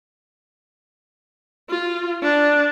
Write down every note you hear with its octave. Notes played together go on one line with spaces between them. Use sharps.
F4
D4